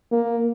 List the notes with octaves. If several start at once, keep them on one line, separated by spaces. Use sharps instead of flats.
A#3